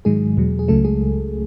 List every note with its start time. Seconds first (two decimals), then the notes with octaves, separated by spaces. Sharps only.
0.05 G#2 D#3 F#3 G#3 G#4
0.37 E2 B2 F#3
0.59 G#4
0.68 C#2 C#3 F#3 A3 A4
0.84 G#3 G#4